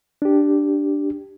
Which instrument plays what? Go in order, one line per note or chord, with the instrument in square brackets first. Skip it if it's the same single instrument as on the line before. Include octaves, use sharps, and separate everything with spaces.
[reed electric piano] D4 G4